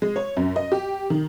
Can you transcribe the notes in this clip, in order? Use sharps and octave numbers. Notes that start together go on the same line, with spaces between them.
G#3
C#5
F#2
D#5
G4
D#3